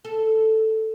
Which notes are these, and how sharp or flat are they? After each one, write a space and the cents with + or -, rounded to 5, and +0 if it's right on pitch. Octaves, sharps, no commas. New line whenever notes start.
A4 +0